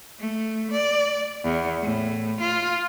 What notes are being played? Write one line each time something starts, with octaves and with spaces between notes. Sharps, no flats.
A3
D5
E2
A2
F4